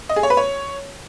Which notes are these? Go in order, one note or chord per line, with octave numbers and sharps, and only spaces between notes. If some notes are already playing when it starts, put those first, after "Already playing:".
D#5
G#4
C#5
B4
C#5